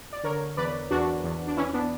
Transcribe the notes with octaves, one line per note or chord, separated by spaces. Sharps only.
D5
D3 A#4 C#5
E2 B4 D5
E2 D4 F#4
E2
D4
E3 C#4 E4
B3 D4